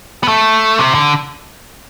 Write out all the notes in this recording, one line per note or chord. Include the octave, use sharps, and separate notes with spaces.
B3
A3
C3
D3